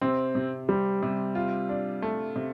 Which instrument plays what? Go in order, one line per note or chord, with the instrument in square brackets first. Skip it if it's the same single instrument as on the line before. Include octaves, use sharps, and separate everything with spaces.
[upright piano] C3 [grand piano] C4
[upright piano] C3
[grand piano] G3 [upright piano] C4
[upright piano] C3
F4
D4
A3
C3